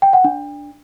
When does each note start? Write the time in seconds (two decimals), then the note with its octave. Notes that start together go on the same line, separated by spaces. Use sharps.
0.02 G5
0.13 F#5
0.24 D4